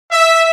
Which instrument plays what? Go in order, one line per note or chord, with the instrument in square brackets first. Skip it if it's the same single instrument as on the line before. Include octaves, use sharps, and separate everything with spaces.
[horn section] E5